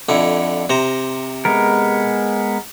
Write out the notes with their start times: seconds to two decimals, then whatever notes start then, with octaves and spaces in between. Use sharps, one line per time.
0.09 F2 D3 E4
0.69 C3 C5 A#5
1.45 G#3 B3 A#4